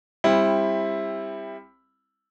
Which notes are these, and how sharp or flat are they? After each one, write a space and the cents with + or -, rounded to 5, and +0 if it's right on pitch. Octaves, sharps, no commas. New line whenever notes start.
G3 +25 C4 +15 E4 +0